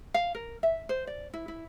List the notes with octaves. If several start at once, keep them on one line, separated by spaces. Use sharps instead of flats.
F5
A#4
E5
C5
D5
E4
E4